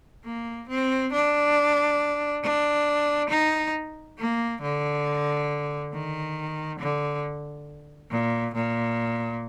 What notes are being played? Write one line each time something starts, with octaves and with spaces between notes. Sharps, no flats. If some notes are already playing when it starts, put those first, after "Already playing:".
A#3
C4
D4
D4
D#4
A#3
D3
D#3
D3
A#2
A#2